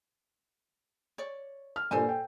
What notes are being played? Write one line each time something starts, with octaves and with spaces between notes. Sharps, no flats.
C#5 D5
F6
G2 A#2 A4 C5 G#5
G5